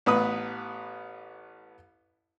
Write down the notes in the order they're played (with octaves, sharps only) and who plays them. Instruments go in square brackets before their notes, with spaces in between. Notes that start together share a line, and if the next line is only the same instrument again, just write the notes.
[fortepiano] A1 B3 B4 D#6